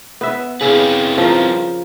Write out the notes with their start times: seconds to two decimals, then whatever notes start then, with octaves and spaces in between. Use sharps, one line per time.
0.21 B3 E5
0.61 C#3 C4 E4 B4
1.18 F3 A#4